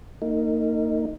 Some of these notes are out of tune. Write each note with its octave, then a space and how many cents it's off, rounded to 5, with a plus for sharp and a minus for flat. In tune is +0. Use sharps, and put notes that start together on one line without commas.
A#3 -30 D#4 +0